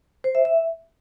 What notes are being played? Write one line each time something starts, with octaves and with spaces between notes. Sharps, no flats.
C5
E5
E5